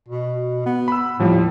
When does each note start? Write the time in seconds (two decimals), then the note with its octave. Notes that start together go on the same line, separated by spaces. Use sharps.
0.08 B2
0.66 B3
0.88 B5 E6
1.19 D#2 A2 F3 G3